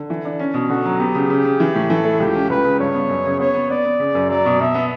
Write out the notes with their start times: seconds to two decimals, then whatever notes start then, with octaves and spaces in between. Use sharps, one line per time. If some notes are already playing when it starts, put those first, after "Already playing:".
Already playing: D3
0.10 E3
0.25 D4
0.39 C#4
0.54 B2
0.69 D3 F#4
0.85 F#3
1.00 B3 G4
1.15 C#3
1.30 C#3
1.45 C#3
1.60 E3
1.75 A2
1.90 E3 A4
2.04 A3
2.20 C#2 G4
2.34 C#4
2.50 C#2 B4
2.64 C#3
2.79 G2 C#5
2.94 B3
3.09 F#2
3.26 C#3
3.39 B3 C#5
3.55 B3
3.70 B3 D5
3.85 B3
3.99 C#3
4.15 F#2
4.30 F#3 D5
4.46 B2
4.60 B2 E5
4.75 B3